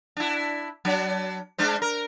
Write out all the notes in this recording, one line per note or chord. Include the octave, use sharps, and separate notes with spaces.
D4 E4
F#3 D4
G#3 D4 C5
A#4